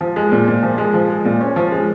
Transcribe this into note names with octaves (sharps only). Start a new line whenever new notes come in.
F3
G#3
A#2
A#2
F3
G#3
F3
G#3
A#2
C#4
F3
G#3